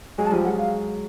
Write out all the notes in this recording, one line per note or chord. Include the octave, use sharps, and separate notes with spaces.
F#3 G#3 G#5
A5
F3 G3 G#5
F#3 G#3 F#5
F5